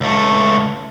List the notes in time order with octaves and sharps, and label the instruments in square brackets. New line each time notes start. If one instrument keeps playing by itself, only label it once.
[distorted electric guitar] C#2 A3